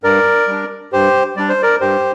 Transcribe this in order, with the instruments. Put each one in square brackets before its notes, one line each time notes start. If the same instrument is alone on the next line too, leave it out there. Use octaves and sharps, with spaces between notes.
[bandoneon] G2 A#4 D5
G3 D4
G2 G4 C5
G3 D4 D5
C5
A#4 D5
G2 G4 C5